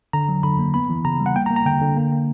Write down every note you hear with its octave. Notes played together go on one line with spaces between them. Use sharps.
D3 A#5
F#3
D3 B5
A#3
B3 B5
E3
C#3 A#5
G3
F#5
A#3 G5
A#5
A#3
A#5
D3 G5
D3
A#3
A#3